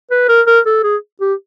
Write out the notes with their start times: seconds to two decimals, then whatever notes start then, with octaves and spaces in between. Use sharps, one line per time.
0.11 B4
0.28 A#4
0.47 A#4
0.66 A4
0.83 G#4
1.21 G4